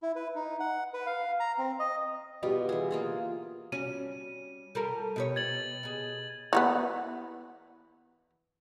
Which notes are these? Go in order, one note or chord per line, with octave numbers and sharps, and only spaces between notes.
E4
B4
D#4
F#5
B4
F5
A#5
C4
D#5
B2 G3 F4 G4 D#5
E3 G#4
A#3 F4 G#4
G3 C#4 F#4 D#7
G3 A4 A#4
B2 G4 C#5
G#6 A6 F#7
B2 G#4
E3 F#3 B3